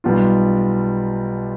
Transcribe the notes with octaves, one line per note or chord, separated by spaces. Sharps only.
B1 B2 G3 B3 F4